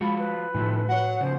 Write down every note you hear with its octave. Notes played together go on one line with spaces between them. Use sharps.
F3 G#3 F4 F#4 B5
B4
A2 D#3 F3 A3
F#4 C#5 F#5
C#3 F3 C5